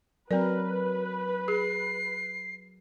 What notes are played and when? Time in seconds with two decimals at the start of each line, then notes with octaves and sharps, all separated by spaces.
0.31 F#3 C4 A#4 B4 D5
1.48 G#4 C7